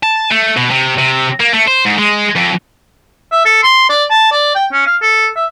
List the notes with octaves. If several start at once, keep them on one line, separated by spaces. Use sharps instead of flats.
A5
A3
B2
C3
C3
A#3
A3
C5
G#2
G#3
F2
E5
A4
C6
D5
A5
D5
G5
C#4
F5
A4
E5